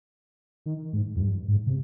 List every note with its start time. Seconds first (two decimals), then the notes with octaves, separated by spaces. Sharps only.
0.66 D#3
0.93 G#2
1.16 F2
1.20 G2
1.48 G#2
1.67 C3